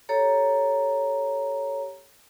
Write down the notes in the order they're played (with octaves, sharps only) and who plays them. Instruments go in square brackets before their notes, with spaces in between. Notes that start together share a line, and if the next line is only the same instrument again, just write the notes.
[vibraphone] G4 A4 C#5 A#5